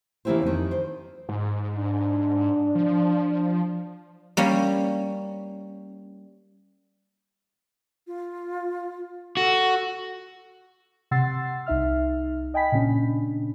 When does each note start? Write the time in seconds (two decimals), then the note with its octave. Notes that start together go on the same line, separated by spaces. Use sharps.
0.25 C#3 E3 A#3 E4 G4 C5
0.42 F2 D#3
0.71 C5
1.29 G#2
1.76 D4
2.75 F3
4.37 G3 A#3 C#4
8.07 F4
9.37 F#4 A4
11.11 C3 F#5 C6 E6 A6 C7
11.66 C2 D#4 E5 F6
12.54 D#5 G5 G#5 B5 B6
12.72 A#2 C#3 C#4 D4